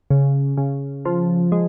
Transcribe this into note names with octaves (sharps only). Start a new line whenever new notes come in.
C#3
C#3
F3
G#3